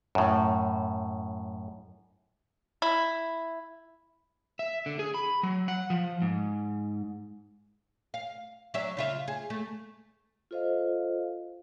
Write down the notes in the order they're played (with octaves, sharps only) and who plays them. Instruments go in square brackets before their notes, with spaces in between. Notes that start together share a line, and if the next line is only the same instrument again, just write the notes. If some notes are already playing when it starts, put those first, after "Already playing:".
[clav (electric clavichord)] F#2 A2
[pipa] E4
[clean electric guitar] E5
D3
G#4
B5
F#3
F#5
F3
G#2
[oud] F5
F#3 D4 E5
C#3 F4 E5
G#4
A3
[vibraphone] F4 A4 C5 D#5 F5